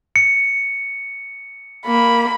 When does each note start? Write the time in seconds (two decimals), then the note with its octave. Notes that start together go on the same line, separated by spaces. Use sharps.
0.16 C#7
1.87 A#3 B5